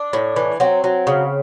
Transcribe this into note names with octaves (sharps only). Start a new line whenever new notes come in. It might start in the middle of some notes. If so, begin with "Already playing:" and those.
Already playing: D4
A2
E3
F#3 C4
F#3
C#3